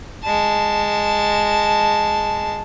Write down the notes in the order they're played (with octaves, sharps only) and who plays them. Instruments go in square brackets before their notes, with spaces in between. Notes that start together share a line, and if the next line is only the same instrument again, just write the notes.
[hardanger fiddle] G#3 A5